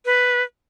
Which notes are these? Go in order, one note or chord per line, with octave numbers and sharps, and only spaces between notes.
B4